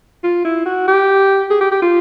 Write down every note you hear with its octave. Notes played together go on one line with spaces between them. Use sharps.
F4
E4
F#4
G4
G#4
G4
G4
F4